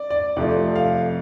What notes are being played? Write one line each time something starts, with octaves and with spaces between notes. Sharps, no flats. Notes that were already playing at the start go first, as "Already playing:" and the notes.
Already playing: D5
D5
F2 C3 F3 A3 D5
F5